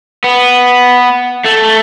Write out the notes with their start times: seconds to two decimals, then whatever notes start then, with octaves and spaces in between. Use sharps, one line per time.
0.24 B3
1.44 A3